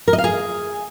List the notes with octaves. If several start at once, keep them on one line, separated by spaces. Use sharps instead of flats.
A#4
D#5
F5
G#4